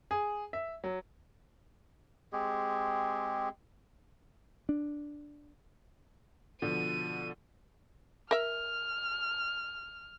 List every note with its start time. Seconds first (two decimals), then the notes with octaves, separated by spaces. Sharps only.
0.11 G#4
0.53 E5
0.84 F#3
2.33 G#3 C4 G4 G#4
4.69 D4
6.62 B2 D3 F3 D#7
8.31 A#4 E5 F6